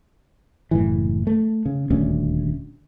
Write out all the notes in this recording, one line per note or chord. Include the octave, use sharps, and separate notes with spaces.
F#1 A2 E3
A3
C#3
D#1 D2 C#4